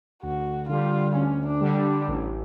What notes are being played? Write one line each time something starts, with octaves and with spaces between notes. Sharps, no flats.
D2 F#4
D3 G3 F4
D2 C#4
D4
D3 G3
D4
A1